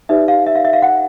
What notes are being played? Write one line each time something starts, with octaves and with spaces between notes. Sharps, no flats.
D#4 G4 B4 D5 E5
F5
E5
F5
E5
F5
F#5